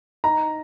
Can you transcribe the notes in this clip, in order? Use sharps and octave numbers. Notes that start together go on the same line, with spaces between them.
D#4 A#5